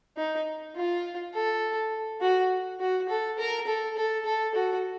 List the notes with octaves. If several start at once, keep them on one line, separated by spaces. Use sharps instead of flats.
D#4
F4
A4
F#4
F#4
A4
A#4
A4
A4
A4
F#4